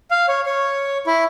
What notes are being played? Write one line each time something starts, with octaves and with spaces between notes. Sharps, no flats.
F5
C#5
C#5
E4